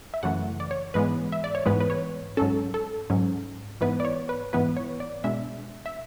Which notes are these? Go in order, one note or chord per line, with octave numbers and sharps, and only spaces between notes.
E5
F#2 C#3 E3 A3 F#5
D5
C#5
G#2 E3 G#3 B3 B4
E5
D5
C#5
G#2 E3 G#3 B3 B4
B4
C#5
G#2 F#3 C#4 A4
A4
G#2 F#3 C#4
G#2 E3 B3 E4 B4
D5
C#5
B4
G#2 E3 B3 E4 B4
C#5
D5
B2 G#3 D4 E5
E5